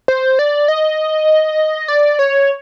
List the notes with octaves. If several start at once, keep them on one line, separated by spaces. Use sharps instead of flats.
C5
D5
D#5
D5
C#5